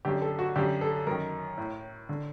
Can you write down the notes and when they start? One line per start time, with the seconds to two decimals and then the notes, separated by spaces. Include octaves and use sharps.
0.05 F#2 D3 G4
0.22 A4
0.39 F#4
0.56 F#2 D3 G4
0.81 A4
1.07 F#2 D#3 A#4
1.58 A2
2.09 D3